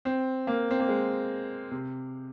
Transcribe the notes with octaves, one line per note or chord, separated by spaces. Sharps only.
C4
A#3
C4
A#3
G#3
C3